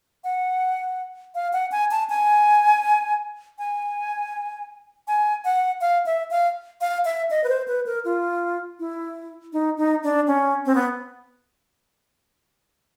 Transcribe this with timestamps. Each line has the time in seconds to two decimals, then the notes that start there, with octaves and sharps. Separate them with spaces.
0.24 F#5
1.35 F5
1.53 F#5
1.72 G#5
1.91 A5
2.10 G#5
3.59 G#5
5.08 G#5
5.45 F#5
5.81 F5
6.06 E5
6.31 F5
6.81 F5
7.05 E5
7.31 D#5
7.44 B4
7.49 C5
7.68 B4
7.86 A#4
8.05 F4
8.80 E4
9.53 D#4
9.78 D#4
10.03 D4
10.27 C#4
10.66 C4
10.75 B3